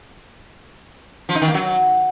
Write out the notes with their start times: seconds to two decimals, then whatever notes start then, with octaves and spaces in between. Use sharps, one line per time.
1.29 F3
1.35 D#4
1.42 D#3
1.48 A#3
1.54 F#3